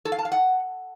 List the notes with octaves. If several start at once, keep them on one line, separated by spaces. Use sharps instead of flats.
A4
F5
A5
F5
F#5